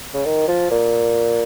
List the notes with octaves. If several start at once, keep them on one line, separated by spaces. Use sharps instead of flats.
C#3
D#3
F3
A#2